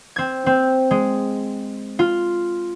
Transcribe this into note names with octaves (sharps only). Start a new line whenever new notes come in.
C4 G#6
C4
G#3
F4